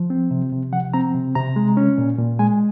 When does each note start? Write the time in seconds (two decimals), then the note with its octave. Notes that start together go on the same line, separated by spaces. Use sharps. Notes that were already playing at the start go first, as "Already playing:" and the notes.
Already playing: F3
0.10 C4
0.31 C3
0.53 C3
0.72 F3 F#5
0.94 C4 A#5
1.14 C3
1.35 C3 A#5
1.56 G#3
1.77 C#4
1.98 A#2
2.18 A#2
2.39 G#3 G#5